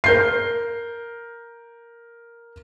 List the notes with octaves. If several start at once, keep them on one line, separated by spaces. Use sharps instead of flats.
A#4 G6 C7